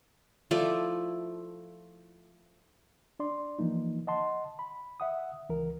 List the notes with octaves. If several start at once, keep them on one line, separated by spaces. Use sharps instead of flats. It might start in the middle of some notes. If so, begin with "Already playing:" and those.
F3 A3 E4 D5
D4 D5 C6
E3 F3 A#3 D#4
D#5 F#5 A5 C6
B5
E5 F#5 D#6
C#2 E3 A#4